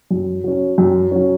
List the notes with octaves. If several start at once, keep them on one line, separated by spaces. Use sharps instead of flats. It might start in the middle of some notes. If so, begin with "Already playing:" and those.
F#2
F#3 C#4
F#2
F#3 C#4